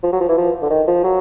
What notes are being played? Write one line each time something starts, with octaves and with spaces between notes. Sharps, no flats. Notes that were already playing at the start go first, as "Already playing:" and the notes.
F3
F#3
F3
E3
F3
D3
D#3
F3
F#3